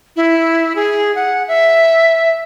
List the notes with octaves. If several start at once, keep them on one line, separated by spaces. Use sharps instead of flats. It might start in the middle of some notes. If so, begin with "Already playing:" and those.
E4
G#4
F#5
E5